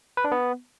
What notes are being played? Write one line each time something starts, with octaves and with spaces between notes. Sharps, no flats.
B4
D4
B3